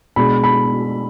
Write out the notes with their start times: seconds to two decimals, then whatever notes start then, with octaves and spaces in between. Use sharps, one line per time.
0.16 B2 G#3 D4 G#4 B5
0.44 B5